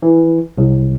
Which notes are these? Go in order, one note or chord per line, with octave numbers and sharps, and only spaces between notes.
E3
C2